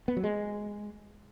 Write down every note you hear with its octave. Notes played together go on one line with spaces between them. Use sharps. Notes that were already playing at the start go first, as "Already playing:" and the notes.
B3
F#3
G#3